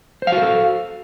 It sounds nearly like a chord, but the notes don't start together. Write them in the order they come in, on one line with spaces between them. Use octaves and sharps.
C5 F5 F#4 A#4 A4